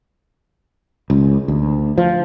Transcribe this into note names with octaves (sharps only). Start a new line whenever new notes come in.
C#2
D2
F3